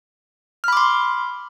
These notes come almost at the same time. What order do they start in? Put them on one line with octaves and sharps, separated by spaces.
F6 B5 D6 C6